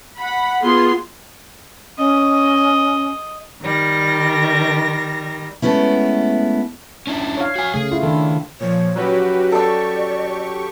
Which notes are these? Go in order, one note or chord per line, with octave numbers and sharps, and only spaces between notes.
F#5 B5
B3 F4 G#4 C6
C#4 D#5
D#3 G3 A#6
G#3 A3 B3 C#4 E4
C#4 D4 E4
C#5 F5
F#4 G#5
C#3 A3 G#4
E4 F4
D#3 D4 A4
A#2 F3 C#5
F#3 G3 C#4 F#4 G4 B4
G4 A4 D5 C#6 E6